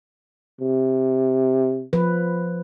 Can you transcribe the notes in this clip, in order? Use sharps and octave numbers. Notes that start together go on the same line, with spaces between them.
C3
F3 B4